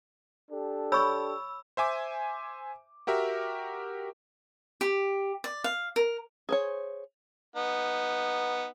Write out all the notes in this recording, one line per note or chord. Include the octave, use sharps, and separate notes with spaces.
D4 G4 A4
C#5 B5 C#6 E6
C5 E5 G#5 D6
F#4 G4 A#4 E5
G4
D5
F5
A#4
G#4 C5 C#5
B3 D#4